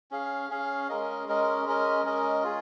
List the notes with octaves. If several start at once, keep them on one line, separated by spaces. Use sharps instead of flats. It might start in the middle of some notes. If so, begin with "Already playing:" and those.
C#4 G#4 F5
C#4 G#4 F5
G#3 C#4 A#4 D#5
G#3 C#4 A#4 D#5
G#3 C#4 A#4 D#5
G#3 C#4 A#4 D#5
F4 G#4